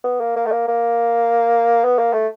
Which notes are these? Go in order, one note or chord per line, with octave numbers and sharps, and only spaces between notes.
B3
A#3
A#3
A3
A#3
A#3
B3
A#3
A3